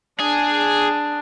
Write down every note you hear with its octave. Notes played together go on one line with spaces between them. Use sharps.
D4 G#4